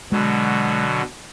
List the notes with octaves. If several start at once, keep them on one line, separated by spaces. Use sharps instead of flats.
B2 D3 F#3 G#3